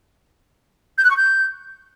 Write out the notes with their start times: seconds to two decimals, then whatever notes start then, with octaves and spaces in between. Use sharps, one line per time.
0.98 G6
1.04 F#6
1.10 C#6
1.17 G6